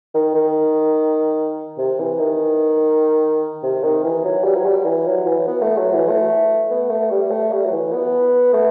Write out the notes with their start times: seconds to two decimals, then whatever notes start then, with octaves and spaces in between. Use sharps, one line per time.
0.14 D#3
0.35 D#3
1.78 C3
1.99 E3
2.19 D#3
3.63 C3
3.83 D#3
4.04 E3
4.25 F#3
4.44 G3
4.57 F#3
4.66 G3
4.85 E3
5.06 F#3
5.27 E3
5.47 B3
5.62 A3
5.78 F#3
5.94 E3
6.09 A3
6.70 B3
6.90 A3
7.11 G3
7.31 A3
7.52 G3
7.66 F#3
7.72 E3
7.93 B3
8.54 A3